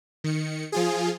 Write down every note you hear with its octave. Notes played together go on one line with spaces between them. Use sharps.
D#3 C#7
F3 F4 G#4